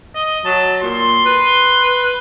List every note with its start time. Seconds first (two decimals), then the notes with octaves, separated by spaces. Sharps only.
0.15 D#5
0.45 F#3 A5
0.83 A#2 C6
1.26 B4